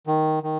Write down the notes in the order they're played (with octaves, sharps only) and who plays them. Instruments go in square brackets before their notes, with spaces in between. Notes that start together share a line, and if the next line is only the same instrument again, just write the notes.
[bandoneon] D#3
D#3